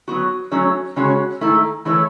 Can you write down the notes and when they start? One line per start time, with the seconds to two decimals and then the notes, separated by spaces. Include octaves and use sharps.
0.08 F#3 B3 F#4
0.51 F#3 A3 C#4 F#4 C#5
0.96 C#3 G#3 C#4 F#4 C#5
1.41 G#2 D#3 A3 E4 A4
1.85 E3 A3 E4 A4 C#5